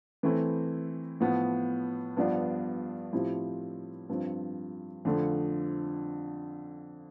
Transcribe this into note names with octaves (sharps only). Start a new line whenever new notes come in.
E3 A3 C4 E4
A2 F3 B3
G2 F3 B3 D4
A2 F3 C4 E4 G4
G2 F3 C4
F2 D3 F3 A3